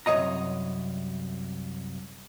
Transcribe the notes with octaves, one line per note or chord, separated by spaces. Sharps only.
C2 F#2 C#3 C#5 D#5 A#5